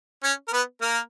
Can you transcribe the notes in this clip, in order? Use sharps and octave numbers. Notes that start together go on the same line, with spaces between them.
C#4 C#5
A#4
B3 B4
A#3 A#4